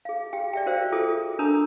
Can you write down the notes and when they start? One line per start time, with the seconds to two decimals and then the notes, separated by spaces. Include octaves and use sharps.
0.05 G#4 F5
0.33 G4 F5 G5
0.53 D5 E5 G5
0.66 F#4 A#4 C5 E5 F5
0.92 F4 G#4 A4 D#6
1.39 D4 A4 A#4 A#5 B5 D#6